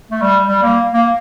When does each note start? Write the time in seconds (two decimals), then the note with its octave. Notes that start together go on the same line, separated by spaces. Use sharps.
0.11 A3
0.21 G3
0.48 G3
0.62 A#3
0.94 A#3